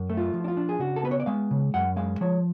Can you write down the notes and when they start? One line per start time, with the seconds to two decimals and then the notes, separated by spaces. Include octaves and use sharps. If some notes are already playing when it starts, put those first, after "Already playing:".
Already playing: F#2
0.10 A3
0.17 F4
0.33 F3
0.44 D4
0.48 F4
0.57 D4
0.69 G#4
0.79 C#3 F#4
0.96 A4
1.03 B3 B4
1.11 C#5
1.20 D5
1.26 G#3 F5
1.51 C#3
1.74 F#2 F#5
1.96 G#3 F5
2.21 F3 C#5